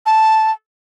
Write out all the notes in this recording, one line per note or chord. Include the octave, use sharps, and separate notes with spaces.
A5